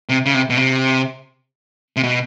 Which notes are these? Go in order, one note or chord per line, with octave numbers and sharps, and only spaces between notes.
C3
C#3
C3
B2
C3
C3
B2